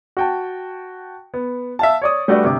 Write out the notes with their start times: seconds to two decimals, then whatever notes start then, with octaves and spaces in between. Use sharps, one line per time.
0.17 F#4 G5 A5
1.34 B3
1.79 E5 F5 A5
2.02 C#5 D5 D#6
2.28 G3 A3 D4 F#4 B4 D5
2.44 G1 C3 D6